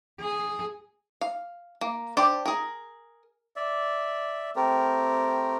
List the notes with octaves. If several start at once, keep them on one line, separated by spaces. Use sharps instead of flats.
G#4
F5
A#3
D4 G4 C5 D5
G#4 A#4
D5 E5
A3 C4 G4 A#4